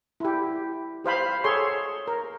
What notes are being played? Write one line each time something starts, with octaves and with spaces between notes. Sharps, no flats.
E4 G4
G4 C5 F5 B5
G#4 A4 C#5 C6
A#4